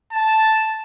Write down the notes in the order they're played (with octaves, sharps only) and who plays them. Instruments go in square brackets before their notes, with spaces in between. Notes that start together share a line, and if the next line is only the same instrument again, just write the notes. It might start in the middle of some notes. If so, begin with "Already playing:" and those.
[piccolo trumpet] A5